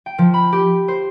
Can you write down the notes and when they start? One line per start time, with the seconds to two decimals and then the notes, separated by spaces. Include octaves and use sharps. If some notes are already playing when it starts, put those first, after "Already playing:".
0.06 G5
0.18 F3
0.34 B5
0.52 G4
0.88 C5